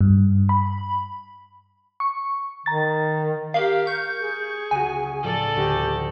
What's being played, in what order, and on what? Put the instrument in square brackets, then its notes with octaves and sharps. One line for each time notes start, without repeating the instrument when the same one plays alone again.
[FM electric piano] G2
B5
C#6
[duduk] D#3 [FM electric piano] A#5 A6
[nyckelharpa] G4 [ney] A#4 [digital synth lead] F5
[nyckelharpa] C#6 [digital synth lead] G6
[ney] G#4
[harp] C#2 F#4 [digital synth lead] G#5
[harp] A2 F3 [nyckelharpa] A4 D5
[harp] D2 [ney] G4